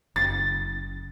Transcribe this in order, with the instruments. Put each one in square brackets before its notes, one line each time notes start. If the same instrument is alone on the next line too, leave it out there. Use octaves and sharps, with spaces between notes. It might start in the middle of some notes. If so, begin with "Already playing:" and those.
[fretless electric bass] F#1 [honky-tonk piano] A6